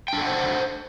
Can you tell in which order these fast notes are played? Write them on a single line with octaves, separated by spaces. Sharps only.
G5 D4 A4 F#5 C5